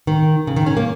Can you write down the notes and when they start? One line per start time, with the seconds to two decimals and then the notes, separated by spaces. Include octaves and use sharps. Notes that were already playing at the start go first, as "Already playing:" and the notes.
0.07 D#3
0.47 C#3
0.56 D#3
0.66 C#4
0.77 A#3